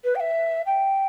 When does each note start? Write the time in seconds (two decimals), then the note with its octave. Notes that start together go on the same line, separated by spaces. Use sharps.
0.04 B4
0.15 G5
0.20 E5
0.66 G5